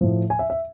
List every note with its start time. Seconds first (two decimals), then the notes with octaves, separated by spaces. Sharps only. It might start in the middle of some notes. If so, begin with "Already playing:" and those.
0.01 A2 F3
0.30 G#5
0.39 E5
0.50 E5